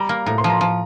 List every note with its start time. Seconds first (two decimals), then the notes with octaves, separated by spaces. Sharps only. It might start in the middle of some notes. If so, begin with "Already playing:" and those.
Already playing: G3 A#5
0.09 A#3
0.26 A2 A#5
0.38 C6
0.44 F3
0.49 A#5
0.61 F3